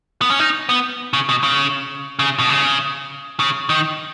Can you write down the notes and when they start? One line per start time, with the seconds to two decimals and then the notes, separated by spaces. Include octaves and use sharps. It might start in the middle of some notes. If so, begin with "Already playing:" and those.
0.21 B3
0.30 C#4
0.39 D#4
0.69 B3
1.13 C#3
1.29 B2
1.43 C#3
2.19 C#3
2.39 B2
2.49 C#3
3.40 C#3
3.70 D#3